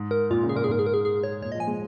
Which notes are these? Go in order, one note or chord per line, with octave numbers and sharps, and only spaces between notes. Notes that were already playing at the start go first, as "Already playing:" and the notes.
Already playing: G#2
A#4
A#2 F4
C#3
G#4
A#2 A#4
G#4
G#2 A#4
G#4
A#4
G#4
G#4
C#5
A#2 C#5
D#5
F3
G#5
G#3